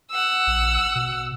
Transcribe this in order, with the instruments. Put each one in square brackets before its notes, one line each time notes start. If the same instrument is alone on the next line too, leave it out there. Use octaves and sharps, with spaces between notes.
[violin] F#5 E6
[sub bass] A#1
B2